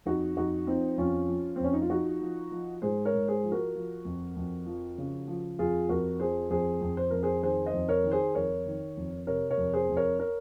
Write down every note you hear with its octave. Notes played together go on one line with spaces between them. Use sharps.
F2 D#4 F#4
F2 D#4 F#4
F3 C4 D#4
F2 C#4 F4
F3
C4
F2 C#4
D#4
F4
F3 D#4 F#4
F3
F3
G#2 G#4 C5
A#4 C#5
G#2
G#4 C5
F3
F#4 A#4
F3
F2
F2
F3
C#3
F3
F2 F4 G#4
F2 F#4 A#4
F3 G#4 C5
F2 G#4 C5
F2
C5
F2 A#4
G#4 C5
D#3 G#4 C5
C5 D#5
F2
A#4 C#5
D#3
G#4 C5
F2 A#4 C#5
D#3
F2
C3 A#4 C#5
A#4 C#5
F2
G#4 C5
F2
A#4 C#5
A#4 C#5